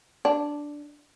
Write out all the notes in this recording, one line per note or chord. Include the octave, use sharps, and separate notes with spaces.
D4